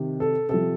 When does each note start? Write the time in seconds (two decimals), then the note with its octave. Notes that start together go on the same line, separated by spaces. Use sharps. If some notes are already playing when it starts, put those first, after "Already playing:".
Already playing: C3 D#3
0.20 A4
0.49 C3 F3 A4